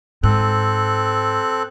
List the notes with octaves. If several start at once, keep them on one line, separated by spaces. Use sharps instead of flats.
G#2 C4 A4 F#6